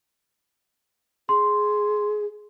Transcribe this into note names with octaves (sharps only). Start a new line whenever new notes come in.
G#4 C6